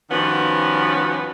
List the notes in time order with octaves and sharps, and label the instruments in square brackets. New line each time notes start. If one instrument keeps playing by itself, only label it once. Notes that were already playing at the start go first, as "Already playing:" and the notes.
[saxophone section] G2 D#3 F3 B3 C#4 F#4